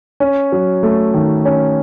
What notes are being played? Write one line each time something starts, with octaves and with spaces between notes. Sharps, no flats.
C#4
F#3
A3
D#3
C#4